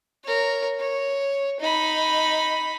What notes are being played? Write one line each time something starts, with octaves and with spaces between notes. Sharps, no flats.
A#4 C#5
C#5
D#4 B5